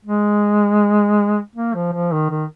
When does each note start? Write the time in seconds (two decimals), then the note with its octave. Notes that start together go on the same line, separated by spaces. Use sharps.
0.05 G#3
1.55 A#3
1.74 F3
1.93 F3
2.12 D#3
2.30 D#3